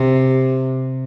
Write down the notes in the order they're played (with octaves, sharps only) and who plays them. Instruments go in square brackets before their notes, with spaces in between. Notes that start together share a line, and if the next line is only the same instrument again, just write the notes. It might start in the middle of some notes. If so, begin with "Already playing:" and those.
Already playing: [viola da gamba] C3